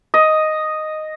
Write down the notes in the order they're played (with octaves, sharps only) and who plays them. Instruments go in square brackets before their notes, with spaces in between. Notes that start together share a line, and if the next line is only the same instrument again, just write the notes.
[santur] D#5